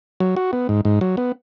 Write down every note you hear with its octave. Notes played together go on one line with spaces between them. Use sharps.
F#3
F#4
B3
G#2
G#2
F#3
B3